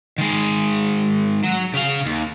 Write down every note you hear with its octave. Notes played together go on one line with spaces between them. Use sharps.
D#3 G#3
F#3
C#3 F5
D#2